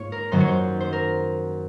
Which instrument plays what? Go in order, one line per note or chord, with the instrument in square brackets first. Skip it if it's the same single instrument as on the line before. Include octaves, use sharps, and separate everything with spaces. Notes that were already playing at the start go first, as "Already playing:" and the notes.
Already playing: [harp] G#2 A#3 F4 C#5
A#4
F#2 D#3 F#3 A#3 C5
C#5
C5
C5
A#4